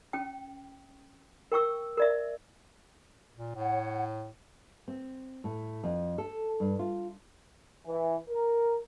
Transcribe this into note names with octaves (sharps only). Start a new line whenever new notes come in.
C#4 G5
A#4 G5 C#6 E6
A#4 D5 E5
A#2
A2 C#5 F#5
C4
A2
F2
A4
G2
F4
E3
A#4